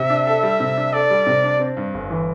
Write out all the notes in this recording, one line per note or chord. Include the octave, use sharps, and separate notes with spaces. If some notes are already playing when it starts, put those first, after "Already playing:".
Already playing: C3 E5
D4
A4
G3
C3
D4
A4 D5
G3
C3
D4
C4
G2
G1
E3